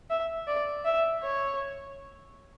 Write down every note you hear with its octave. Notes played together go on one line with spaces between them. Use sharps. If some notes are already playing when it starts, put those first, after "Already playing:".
E5
D5
E5
C#5